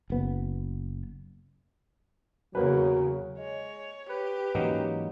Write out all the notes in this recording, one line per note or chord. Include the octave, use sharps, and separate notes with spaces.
F#1 B3
E2 C#3 F#3 A#3 B4
G#3 C#5
G4 B4
G#2 E3 F#3 A#3 C#4 D#4